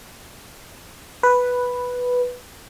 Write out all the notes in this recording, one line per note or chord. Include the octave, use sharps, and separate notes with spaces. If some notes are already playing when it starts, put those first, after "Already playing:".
B4